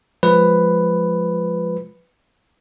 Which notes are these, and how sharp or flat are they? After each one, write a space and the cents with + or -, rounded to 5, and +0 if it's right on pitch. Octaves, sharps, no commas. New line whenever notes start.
F3 +10 G#3 +0 B4 +5